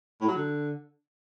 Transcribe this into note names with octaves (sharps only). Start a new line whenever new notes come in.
A2
F#3
D3